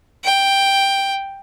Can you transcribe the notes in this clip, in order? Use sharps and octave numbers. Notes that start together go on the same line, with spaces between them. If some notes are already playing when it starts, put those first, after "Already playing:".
G5